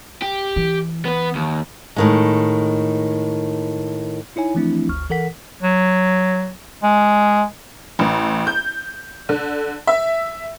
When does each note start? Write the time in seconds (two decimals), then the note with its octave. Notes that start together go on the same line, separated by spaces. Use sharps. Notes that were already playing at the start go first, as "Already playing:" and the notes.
0.22 G4
0.56 E3
1.05 B3 B4
1.35 D#2
1.96 A2 D#3 G#3
4.36 D#4 E4 C#5 G#5
4.55 E3 F3 A3 C4 D4 E4
4.89 G1 D2 C#6 F6
5.10 E3 A4 A#4 F#5 B6
5.62 F#3
6.83 G#3
7.99 A1
8.47 G6
9.29 D3
9.87 E5